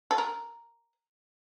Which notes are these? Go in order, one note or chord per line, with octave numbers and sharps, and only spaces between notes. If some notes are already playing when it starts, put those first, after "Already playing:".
A4
A#4